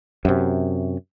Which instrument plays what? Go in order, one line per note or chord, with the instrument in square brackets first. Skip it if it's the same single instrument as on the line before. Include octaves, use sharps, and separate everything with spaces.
[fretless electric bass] F#2 C3